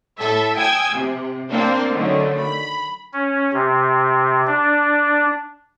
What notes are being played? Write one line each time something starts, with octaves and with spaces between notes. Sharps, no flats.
A2 A4 E5
G5 G#5 D#6 E6 G#6
C3
A#3 C4 D4 C5
D3 D#3 F#3 A3 C#4
B5
C#4
C3
D4